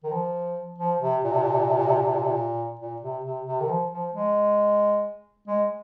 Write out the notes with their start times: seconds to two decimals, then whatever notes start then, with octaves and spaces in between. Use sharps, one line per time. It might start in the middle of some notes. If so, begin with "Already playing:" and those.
0.04 D#3
0.12 F3
0.78 F3
1.01 C3
1.24 A#2
1.32 C3
1.42 A#2
1.51 C3
1.59 A#2
1.68 C3
1.77 A#2
1.87 C3
1.96 A#2
2.04 C3
2.13 A#2
2.22 C3
2.31 A#2
2.80 A#2
3.02 C3
3.24 C3
3.46 C3
3.60 D#3
3.69 F3
3.91 F3
4.13 G#3
5.47 G#3